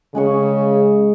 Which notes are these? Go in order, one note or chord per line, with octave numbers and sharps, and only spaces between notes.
C#3 G#3 G#4 C#6